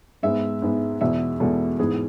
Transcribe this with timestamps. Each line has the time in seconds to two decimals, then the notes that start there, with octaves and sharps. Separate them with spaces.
0.23 G#2 G#3 B3 E5
0.62 G#2 G#3 B3
1.01 E2 B2 G#3 B3 E5
1.40 E2 B2 G#3 B3 A4
1.79 G#2 E3 B3 G#4